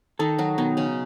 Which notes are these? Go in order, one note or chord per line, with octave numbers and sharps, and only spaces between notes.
D#3 D#4 A4
F#3 F#4
B2 D#3 D#4
C#3 C#4